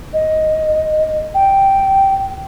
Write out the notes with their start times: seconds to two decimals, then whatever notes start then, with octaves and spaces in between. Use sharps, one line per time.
0.13 D#5
1.34 G5